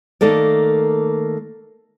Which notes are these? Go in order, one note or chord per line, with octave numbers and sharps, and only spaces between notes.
D#3 A3 A#3 A4 D5